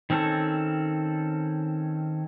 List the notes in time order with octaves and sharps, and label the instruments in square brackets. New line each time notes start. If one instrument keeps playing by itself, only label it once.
[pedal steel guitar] D#3 C4 C#4 A4